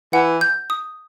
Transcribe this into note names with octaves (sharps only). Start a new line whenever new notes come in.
E3 F#5
G6
D#6